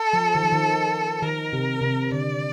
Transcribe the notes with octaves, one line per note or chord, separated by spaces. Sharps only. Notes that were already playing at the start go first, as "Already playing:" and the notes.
Already playing: A4
F3
D#3
F3
D#3
D#3 A#4
C3
C3
D3 D5